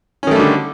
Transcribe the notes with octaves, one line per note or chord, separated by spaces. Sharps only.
D3 D#3 G3 A3 C#4